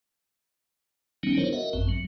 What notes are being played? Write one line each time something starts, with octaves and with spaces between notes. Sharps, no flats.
D#3 F#3 G3 B3 C#4 D#4
B3 D4 E4 A#4 C5 C#5
F#4 A#4 D#5 E5 F#5
A1 F#2 C4
F#3